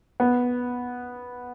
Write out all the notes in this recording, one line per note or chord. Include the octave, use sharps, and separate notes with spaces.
B3